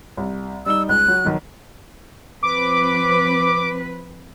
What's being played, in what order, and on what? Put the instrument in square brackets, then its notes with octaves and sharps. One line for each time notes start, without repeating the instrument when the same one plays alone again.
[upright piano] C2
[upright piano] G3 D#4 G7 [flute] E6
[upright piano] C#2 [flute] F#6
[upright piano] F#3
B1 D#3
[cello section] F3 C4 B4 [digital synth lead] D6